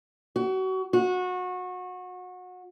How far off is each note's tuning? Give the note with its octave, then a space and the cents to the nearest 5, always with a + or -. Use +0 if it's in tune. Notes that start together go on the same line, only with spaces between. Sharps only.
F#4 +30
F#4 -25